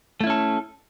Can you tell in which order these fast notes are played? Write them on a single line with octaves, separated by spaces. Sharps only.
A3 E4 C#4 A4